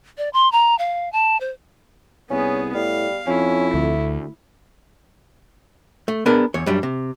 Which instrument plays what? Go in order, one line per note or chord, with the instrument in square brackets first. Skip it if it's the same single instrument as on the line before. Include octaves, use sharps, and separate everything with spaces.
[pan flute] D5
C6
A#5
F5
A5
C5
[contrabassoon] C2 [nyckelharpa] B3 G#4 [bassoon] C#4
[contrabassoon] A2 [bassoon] G3 [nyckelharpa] F5
[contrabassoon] F2 [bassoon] C#4 [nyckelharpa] E4
[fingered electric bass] D2 [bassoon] A3
[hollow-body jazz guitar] A3
B3 D4 G#4 A#4
E2 C#5
F#2 G3 D4
C3